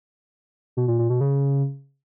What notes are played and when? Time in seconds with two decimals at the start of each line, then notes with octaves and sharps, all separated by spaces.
0.77 B2
0.88 A#2
0.99 A#2
1.10 B2
1.21 C#3